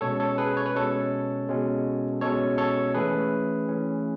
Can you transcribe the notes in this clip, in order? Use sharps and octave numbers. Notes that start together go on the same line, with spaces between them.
B2 G#3 C#4 A4 C#5
A4 C#5
G#4 B4
C#5
B4
B2 G#3 C#4 A4 C#5
B2 G#3 C#4
B2 G#3 C#4 A4 C#5
A4 C#5
E3 A3 C#4 G#4 B4
E3 A3 C#4